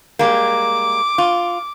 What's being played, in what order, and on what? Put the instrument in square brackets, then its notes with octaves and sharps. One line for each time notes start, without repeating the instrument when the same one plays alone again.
[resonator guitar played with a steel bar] G3 G#3 A#3 [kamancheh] D6
[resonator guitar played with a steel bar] F4